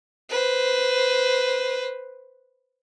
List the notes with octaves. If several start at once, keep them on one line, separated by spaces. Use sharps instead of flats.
B4 C5